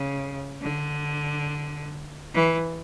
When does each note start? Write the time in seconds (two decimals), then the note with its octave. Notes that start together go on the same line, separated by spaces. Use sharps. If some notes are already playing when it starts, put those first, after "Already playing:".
Already playing: C#3
0.62 D3
2.34 E3